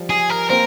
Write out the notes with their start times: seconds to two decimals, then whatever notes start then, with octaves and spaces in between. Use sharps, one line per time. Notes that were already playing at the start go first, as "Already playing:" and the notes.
Already playing: F3 G3
0.10 G#4
0.30 A#4
0.50 A#3 C4 A#4